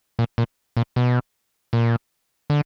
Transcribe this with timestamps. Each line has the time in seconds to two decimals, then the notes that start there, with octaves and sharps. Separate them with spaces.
0.19 A#2
0.38 A#2
0.77 A#2
0.96 B2
1.73 A#2
2.50 D3